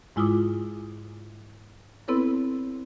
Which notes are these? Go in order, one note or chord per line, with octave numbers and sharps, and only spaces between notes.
G#2 G#3 E4 F4 D6 D#6
B3 C4 E4 A4 B4 C#5